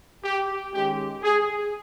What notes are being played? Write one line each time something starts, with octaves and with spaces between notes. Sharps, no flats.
G4
D#3 G#3 C#4 G4
G#4